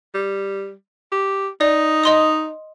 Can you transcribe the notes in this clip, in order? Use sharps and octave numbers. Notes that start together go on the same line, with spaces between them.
G3
G4
D#4 D5
D#5 C6 D#6